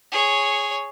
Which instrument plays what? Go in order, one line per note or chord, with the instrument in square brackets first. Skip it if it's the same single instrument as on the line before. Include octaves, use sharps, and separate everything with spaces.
[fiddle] G#4 C#5